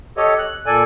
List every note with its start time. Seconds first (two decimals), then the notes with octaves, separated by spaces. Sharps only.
0.17 G4 A4 C#5 D#5
0.38 F#6
0.66 A#2 A4 D5 G#5